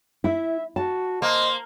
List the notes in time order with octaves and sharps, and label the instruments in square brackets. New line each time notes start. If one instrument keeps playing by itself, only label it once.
[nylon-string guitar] E4 [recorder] E5
[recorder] F#4 [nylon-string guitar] A5
[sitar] A#3 [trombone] C5 [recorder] D#5